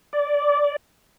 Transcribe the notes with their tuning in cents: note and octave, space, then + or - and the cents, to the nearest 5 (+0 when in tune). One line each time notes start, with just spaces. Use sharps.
D5 -15